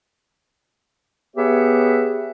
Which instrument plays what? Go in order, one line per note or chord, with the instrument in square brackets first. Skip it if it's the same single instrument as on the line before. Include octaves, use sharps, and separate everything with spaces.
[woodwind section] B3 G4 G#4 B4 C#5 E5